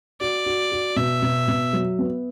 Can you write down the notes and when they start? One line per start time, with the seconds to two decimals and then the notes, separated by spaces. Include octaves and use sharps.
0.20 F#4 D5
0.46 F#4
0.72 F#4
0.96 B2 E5
1.22 B2
1.48 B2
1.73 F#3
1.99 B3